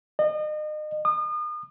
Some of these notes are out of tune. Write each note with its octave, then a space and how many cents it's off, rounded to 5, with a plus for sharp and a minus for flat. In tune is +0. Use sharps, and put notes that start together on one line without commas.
D#5 -35
D#6 -35